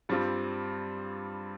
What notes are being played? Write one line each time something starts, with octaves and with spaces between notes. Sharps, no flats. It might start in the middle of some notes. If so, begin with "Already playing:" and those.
G2 G3 C4 F4